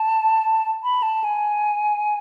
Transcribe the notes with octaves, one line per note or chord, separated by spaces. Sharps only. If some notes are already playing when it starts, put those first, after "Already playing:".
Already playing: A5
B5
A5
G#5